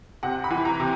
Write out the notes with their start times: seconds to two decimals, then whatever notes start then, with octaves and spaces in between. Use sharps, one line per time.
0.23 C3 F#5
0.44 B5
0.50 E3
0.65 A#5
0.80 C3